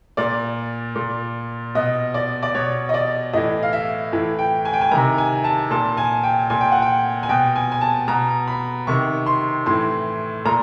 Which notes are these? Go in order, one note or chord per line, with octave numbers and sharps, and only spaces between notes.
A#2 D5
A#2
B2 D#5
D5
D5
B2 C#5
D#5
D5
A2 E3 D#5
F5
E5
A2 E3
G5
G#5
G5
G#5
C3 D#3 A#5
G#5
A5
A#2 A5
G#5
G5
A#2 G#5
G5
F#5
G5
G#5
B2 G5
G#5
G#5
A5
B2 A#5
B5
C3 D#3 C#6
C6
A2 E3 C6
A#2 A#5